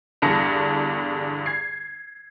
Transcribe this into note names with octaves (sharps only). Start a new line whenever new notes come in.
E2 G2 D3 A5 A#6 C#7
G#6 C7